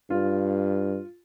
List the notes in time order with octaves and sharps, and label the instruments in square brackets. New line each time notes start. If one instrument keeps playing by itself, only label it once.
[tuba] G2 [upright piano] F4